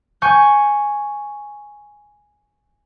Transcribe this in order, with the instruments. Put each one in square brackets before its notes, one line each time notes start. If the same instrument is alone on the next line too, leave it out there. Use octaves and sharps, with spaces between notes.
[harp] G#5 C#6 G6